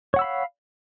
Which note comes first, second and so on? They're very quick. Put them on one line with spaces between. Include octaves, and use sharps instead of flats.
C#5 F#5 E6 B5 F5